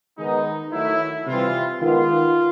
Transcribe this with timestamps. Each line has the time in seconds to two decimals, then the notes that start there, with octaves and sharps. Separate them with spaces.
0.18 D#3 G#3 B3 D#4
0.72 D#3 F#3 A3 E4
1.27 C3 E3 G3 F4
1.81 D#3 G#3 B3 F4